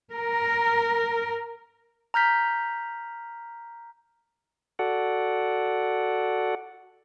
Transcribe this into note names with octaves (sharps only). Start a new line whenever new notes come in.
A#4
A#5 F6 G6 B6
F#4 A4 D5 F#5